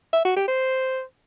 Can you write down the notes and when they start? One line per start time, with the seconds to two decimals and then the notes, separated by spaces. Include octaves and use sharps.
0.13 E5
0.25 F#4
0.36 G4
0.48 C5